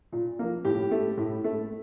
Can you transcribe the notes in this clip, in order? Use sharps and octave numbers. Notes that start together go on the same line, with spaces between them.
A#2
F3 A#3
A2 G4
A3
A2
A3